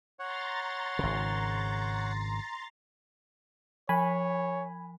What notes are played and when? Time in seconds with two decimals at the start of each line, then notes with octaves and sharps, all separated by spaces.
0.19 C#5 F#5 A#5 C6 A6
0.99 G#1 C#3
3.89 F3 C#5 G#5 B5